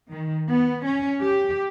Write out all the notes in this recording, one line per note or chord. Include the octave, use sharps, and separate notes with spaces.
D#3
B3
C#4
G4